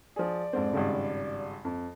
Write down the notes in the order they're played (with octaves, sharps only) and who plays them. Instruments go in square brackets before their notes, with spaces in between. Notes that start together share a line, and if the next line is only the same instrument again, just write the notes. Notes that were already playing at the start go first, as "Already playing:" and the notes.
[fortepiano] F3 G#4 [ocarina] D5
[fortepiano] F2 G#2 C4
G#1 G2 C#3
F2